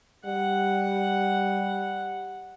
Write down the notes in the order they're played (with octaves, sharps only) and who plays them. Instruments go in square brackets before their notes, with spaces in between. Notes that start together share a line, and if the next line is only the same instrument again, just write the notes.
[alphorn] G3 [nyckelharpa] F#5